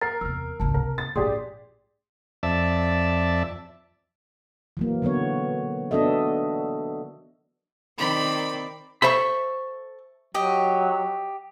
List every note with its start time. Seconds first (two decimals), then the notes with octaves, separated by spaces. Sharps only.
0.01 A#4 A6 C7
0.21 E2 C3 E6 F6
0.60 G#1 C#2 A5
0.74 C3 A#4
0.98 A6
1.16 A#1 G#2 D4 G4 G#4 D5 C6
2.43 F2 D5 E5 A5
4.77 E3 F#3 A#3
5.02 D3 F#3 B3 C#5
5.91 B3 D4 F#4 A4 D#5 E5
7.98 D#3 C4 D5 B5
9.02 A4 C5 E5 B5 C#6
10.34 F#3 G4 D#5